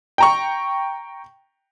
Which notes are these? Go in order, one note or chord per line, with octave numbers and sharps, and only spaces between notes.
G5 A#5 C#6